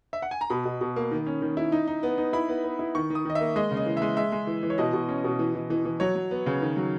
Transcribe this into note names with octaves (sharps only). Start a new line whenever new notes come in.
E5
F#5
G#5
A#5
B2 B5
B2
B2
A#3
D#3
C#4
D#3
E4
D#4
D#4
B3
D#4
E4 B5
B3
B3
E4
D#3 C#6
D#3
D#6
D#3 D#5
E5
A#3
G#3 D#5
C#3
D#5
E3
G#3 E5
G#3 E5
G#3
E3
E3
C#5
B2 D#5
B2
C#4
B2
E3
E3
E3
E3
F#3 C#5
F#3
B3
C#3
D#3
F#3